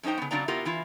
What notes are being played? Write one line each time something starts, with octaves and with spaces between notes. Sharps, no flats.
F#2 C#4 D#4 C5 G5
C#3 B3
C#3 F#3 C4 D4 D5 A#5
B3 E4 F4 G4 A#4
E3 E4 F4